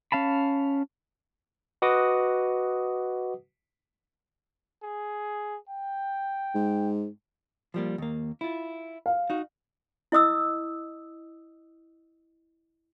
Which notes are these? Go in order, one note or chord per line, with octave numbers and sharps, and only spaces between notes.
C#4 F5 A5 B5
F#4 B4 D#5 F#5 D6 D#6
G#4
G5
G#2
F3 G3 A#3
D#2 A#3
E4 F4
F5
D#4 F#4
E4 D#5 D#6 E6